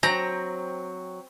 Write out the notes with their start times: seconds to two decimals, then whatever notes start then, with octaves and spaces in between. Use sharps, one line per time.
0.03 F#3 C4 A#5